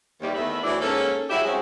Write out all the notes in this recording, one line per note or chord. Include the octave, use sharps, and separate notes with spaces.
D#2 E3 G3
E2 D#3 A3 B4 E5
D2 E3 F#3 D4 E4
G#2 A#3 C#4 A4
F#3 G3 E4 G4 G#4 E5
F#3 G#3 C4 C#4 F#4 G#4